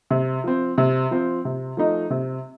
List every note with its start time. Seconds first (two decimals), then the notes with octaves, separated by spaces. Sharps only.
0.11 C3
0.44 F3 C4
0.78 C3
1.11 F3 C4
1.45 C3
1.77 F3 A3 D#4
2.10 C3